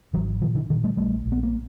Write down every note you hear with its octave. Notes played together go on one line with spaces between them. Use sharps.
G#1 E3 F#3
A#2 D#3 F3
D3 E3
A#2 D#3
G3 A3
A#1 G3 A3
A#1
B3
A#3